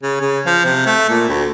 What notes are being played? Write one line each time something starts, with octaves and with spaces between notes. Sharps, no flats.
C#3
C#3
F3
C3
A3
A#2
D2